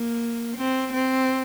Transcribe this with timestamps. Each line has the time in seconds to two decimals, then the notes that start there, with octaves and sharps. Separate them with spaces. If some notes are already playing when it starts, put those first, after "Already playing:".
Already playing: A#3
0.57 C4
0.93 C4